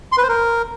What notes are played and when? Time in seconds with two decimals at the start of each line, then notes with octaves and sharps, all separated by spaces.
0.12 C6
0.18 B4
0.23 C5
0.29 A#4